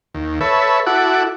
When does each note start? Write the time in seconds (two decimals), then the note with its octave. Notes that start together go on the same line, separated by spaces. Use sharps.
0.14 D#2
0.41 A4 B4 C#5 E5
0.87 E4 F#4 A4 F#5 D6